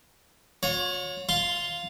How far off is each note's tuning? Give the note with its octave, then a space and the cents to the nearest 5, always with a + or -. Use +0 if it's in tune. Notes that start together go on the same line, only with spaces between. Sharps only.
F4 +45 C#5 +0
F4 +0 C6 +0